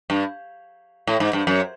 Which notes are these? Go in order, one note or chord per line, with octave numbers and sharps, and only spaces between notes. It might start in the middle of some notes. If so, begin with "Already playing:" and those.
G2
A2
G#2
G2
F#2